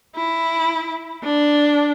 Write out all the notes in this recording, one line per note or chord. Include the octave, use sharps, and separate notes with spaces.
E4
D4